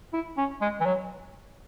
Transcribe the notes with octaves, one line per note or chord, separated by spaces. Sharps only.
E4
C#4
G#3
E3
F#3